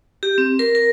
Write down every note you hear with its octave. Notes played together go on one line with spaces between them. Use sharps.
G4
C4
A#4
A#4